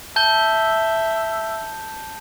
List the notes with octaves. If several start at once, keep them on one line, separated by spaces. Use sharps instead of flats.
E5 A5 G6 G7